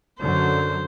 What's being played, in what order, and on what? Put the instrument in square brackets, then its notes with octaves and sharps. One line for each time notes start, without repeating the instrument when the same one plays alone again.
[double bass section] F#2 D3 F#3 [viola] C5